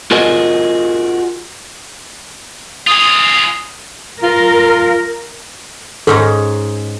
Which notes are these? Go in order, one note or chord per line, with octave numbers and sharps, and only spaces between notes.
F4 F#4 G#4 A#4 D#5
F4 G#4 D#6
F4 A#4
G#2 C#4 D#4 A4